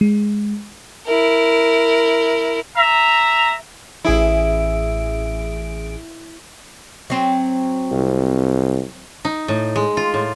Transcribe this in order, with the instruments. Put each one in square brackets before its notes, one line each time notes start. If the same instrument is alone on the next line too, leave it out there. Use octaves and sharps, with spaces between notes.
[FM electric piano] G#3
[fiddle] E4 A#4
[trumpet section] E5 A#5
[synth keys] A1 G#4 D7 [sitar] E4
[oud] F#3 C4
[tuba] C2
[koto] D#4
A2
G#3
F4
A2